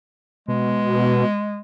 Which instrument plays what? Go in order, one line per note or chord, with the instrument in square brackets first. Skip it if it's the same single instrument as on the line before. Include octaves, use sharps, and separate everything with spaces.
[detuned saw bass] B2 [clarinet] G#3